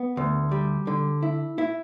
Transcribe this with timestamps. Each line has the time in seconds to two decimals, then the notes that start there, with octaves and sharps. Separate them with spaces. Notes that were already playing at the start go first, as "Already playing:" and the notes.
Already playing: B3
0.17 D2
0.51 G3
0.87 D3
1.22 E4
1.58 E4